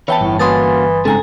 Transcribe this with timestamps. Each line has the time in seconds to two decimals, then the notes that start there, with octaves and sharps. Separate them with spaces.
0.08 E3 B3 E4 C#5 G5 A5
0.21 G1 A2
0.39 E3 A#3 C#4 F#4 C6 D#6 A6
1.05 G#2 C#3 C4 A4 G#5 A#5